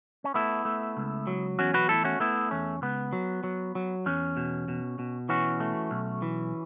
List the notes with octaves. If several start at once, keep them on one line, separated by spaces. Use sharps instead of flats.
C#4
A3 B3 E4
A3
C#2
F#3
E2 C#4 F#4
F#4 B4
A3 E4 A4
C#4 F#4
A3 B3 E4
E2 C#4
C#2 B3
F#3
F#3
F#3
E2 C#4
B2
B2
B2
E3 C#4 F#4
A3
B1
E3